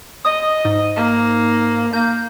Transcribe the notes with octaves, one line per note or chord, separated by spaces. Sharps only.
D#5 D#6
G#2
A#3
A#3 G6